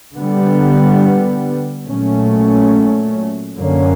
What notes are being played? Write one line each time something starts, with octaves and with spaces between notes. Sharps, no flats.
D3 G3 B3
A#2 F#3 A3 C#4
F#2 D3 F#3 A#3 C#4